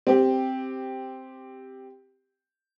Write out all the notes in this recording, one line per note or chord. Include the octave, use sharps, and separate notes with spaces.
C4 G4